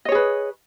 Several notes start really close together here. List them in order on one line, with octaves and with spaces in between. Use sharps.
D#5 C#5 G#4 B4